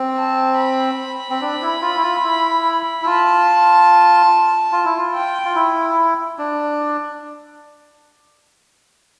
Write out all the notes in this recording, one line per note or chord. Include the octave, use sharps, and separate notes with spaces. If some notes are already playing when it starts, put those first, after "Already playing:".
Already playing: C4
A5
B5
C4
D4
E4
F4
E4
F4
E4
E4
F4 A5
F4
E4
F4
G5
F4
E4
D4